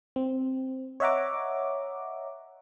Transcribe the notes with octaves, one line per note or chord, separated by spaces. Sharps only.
C4
C#5 D#5 E5 F#5 A#5 D6